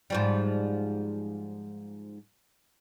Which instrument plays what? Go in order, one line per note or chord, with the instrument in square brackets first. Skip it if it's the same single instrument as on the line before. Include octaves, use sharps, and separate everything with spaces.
[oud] G#2 F3 G3